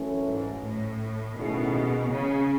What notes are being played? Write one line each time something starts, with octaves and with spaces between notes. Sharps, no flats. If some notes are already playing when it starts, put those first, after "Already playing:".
Already playing: F#2 E3 A3 C#4
G#2
A2
B2 D#3 A3 C#4 E4 G#4
C#3